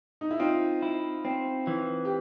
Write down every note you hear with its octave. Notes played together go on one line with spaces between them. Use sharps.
D#4
E4
C4 D#4 F4
E4
C4
E3
G4